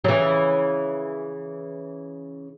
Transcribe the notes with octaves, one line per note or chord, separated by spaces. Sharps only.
F#3
C#3 E3